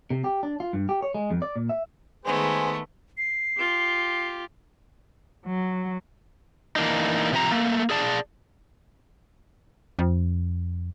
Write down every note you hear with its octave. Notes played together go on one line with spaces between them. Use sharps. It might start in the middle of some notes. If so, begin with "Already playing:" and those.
C3
G4
D4
F4
G2
G4
C#5
G#3
F2
D5
A#2
E5
D#3 G#3 A3 B3 G#4 C5
C7
F4 G4
F#3
E3 A#3 D4 D#4
C3 F3 G4 C5 A#5
A3 A#3
G#4 D5 A5
F2